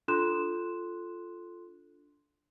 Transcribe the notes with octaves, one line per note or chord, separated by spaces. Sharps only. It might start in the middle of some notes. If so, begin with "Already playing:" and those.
D4 F4 A4 C6 F#6 E7